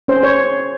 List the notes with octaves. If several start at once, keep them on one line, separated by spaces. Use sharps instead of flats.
C#4 C5
C#5